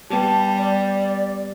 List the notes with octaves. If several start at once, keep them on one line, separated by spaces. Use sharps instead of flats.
G3 B3 G4 A5
D5